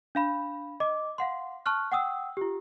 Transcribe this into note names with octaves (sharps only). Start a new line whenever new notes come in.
D4 F5 B5
D#5 D6
F5 F#5 C6
A5 C#6 F6 F#6
F#5 G5 D#6 E6
F4 G4